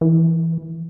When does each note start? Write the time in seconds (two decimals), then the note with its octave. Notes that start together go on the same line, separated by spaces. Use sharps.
0.01 E3